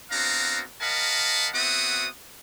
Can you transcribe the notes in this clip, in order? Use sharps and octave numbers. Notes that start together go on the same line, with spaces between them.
B3 C4 D4 F#4 F5 A#5
A#4 D#5 F5 F#5 A5 B5
B3 C4 F#4 E5 F#5 D#6